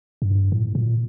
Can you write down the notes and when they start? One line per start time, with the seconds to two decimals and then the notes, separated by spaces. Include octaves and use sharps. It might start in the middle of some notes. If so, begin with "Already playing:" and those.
0.22 G2
0.52 A2
0.75 A#2